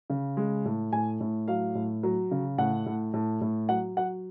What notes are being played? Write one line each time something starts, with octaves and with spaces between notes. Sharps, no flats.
C#3
G#3
A2
A2 G#5
A2
F#3 F5
A2
F#3
C#3
A2 F#5
A2
A2
A2
F#3 F#5
F#3 F#5